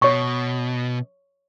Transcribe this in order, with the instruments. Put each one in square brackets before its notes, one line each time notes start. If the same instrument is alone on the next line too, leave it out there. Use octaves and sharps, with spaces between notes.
[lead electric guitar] B2 [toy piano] C#5 C#6